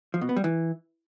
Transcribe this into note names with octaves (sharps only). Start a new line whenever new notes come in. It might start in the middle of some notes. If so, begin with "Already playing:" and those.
F3
B2
B3
G3
E3